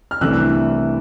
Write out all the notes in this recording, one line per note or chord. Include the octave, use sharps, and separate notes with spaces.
F6
C2 C3 E3 A3 D4 E6 F#6